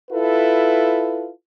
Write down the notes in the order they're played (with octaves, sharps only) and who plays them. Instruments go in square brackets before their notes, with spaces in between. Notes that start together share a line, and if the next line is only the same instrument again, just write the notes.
[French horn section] E4 F4 A4 B4